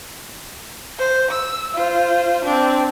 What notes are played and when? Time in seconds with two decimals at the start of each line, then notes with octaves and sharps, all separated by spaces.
0.99 C5
1.31 E6
1.74 F4 C5
2.44 C4 D4